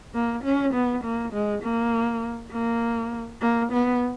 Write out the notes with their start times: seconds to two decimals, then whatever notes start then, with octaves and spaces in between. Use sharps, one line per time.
0.14 A#3
0.44 C#4
0.74 B3
1.04 A#3
1.33 G#3
1.63 A#3
2.53 A#3
3.42 A#3
3.72 B3